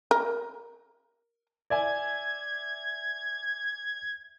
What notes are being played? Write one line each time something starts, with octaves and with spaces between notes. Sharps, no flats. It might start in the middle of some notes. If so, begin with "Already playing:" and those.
A#4
D5 E5 G#5 G#6